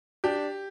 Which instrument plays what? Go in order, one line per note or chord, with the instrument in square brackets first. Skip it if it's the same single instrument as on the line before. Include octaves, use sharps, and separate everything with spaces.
[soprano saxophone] D4 [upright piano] G4